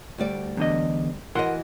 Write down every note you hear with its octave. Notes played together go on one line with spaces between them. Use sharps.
D2 G3 D5
E2 D3 D#5
E3 F#4 A#4 D#5 F#5 C6